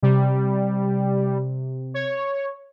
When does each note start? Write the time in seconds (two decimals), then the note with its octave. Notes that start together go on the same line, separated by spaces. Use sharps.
0.03 C3 G3
1.94 C#5